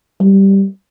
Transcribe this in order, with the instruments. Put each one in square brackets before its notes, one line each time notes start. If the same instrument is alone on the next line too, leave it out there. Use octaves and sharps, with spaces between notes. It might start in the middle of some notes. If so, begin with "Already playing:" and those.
[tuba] G3